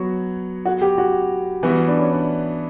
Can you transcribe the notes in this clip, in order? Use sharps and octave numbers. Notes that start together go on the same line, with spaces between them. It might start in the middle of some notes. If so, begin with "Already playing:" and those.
Already playing: F#3 B3 F#4 C#5
F#4
G4
F#4
E3 G3 B3 E4 F#4
D4
C#4
D4